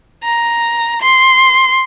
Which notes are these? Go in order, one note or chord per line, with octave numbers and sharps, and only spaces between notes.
A#5
C6